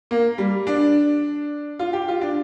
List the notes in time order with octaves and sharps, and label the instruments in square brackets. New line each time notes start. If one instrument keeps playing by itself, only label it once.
[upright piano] A#3
G3
D4
F4
G4
F4
D4